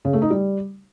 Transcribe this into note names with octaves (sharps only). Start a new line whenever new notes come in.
C#3
A3
D#4
G3